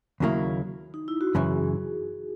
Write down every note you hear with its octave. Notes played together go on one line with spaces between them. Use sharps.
D#2 C#3 F#3 A#3 E4
D#4
E4
F#4
F#2 C#3 E3 G#4